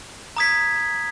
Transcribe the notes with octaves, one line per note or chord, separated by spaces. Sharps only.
A#5 D#6 G#6 B6